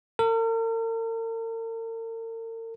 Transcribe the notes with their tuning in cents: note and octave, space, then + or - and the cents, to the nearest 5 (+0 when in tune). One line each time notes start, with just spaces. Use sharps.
A#4 -45